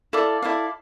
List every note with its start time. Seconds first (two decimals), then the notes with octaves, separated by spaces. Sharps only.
0.13 E4 A4 D5 F5
0.42 E4 A4 D5 F5